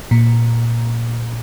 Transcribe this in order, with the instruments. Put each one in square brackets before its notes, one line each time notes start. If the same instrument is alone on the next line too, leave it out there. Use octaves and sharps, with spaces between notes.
[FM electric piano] A#2